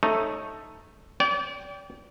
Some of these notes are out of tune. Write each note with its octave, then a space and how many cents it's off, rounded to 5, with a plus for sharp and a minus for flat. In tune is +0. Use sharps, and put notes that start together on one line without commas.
A3 +0 D#4 +0 C#5 -15
D5 -40 G5 +0